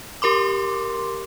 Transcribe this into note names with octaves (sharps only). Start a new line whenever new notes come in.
G4 A#4 C6 D6